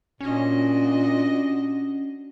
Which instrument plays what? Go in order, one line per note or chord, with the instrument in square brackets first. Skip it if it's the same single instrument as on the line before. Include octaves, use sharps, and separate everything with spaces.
[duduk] A#2 [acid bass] C#4 [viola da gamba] D4 F#4 D#5